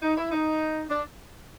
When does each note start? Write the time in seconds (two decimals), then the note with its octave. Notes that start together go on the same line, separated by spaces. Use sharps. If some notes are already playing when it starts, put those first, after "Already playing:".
0.02 D#4
0.17 E4
0.31 D#4
0.89 D4